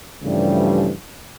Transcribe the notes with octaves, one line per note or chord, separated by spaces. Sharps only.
G2 C#3 E3 F3 G3 A3